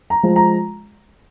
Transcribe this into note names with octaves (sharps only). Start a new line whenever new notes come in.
A#5
F3 G#3
A#5